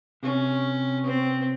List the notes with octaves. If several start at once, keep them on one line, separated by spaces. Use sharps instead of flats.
C3 C#4
C4